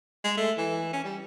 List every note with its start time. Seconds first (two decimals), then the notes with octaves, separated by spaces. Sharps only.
0.24 G#3
0.37 A3
0.57 E3
0.93 C#4
1.04 G3